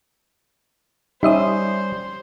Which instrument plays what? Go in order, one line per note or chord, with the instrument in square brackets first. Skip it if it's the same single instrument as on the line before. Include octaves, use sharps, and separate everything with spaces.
[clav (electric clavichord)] G3 C#4 [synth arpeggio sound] D#4 E5 D#6 [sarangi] C5